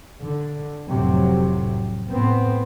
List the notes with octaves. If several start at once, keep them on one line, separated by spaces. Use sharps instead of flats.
D3
F1 A2 C3 F#3
A2 B3 C4